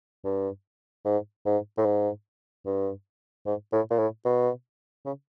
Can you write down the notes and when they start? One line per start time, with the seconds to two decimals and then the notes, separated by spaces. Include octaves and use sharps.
0.25 G2
1.05 G#2
1.46 G#2
1.78 A2
1.85 G#2
2.66 G2
3.46 G#2
3.73 A2
3.91 A#2
3.99 A2
4.25 B2
5.06 C#3